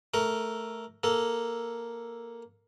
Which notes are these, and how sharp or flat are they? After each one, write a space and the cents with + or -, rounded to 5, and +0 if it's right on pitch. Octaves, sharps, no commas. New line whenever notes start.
A3 +0 A#4 +0 C#6 +35
A#3 +0 A4 +0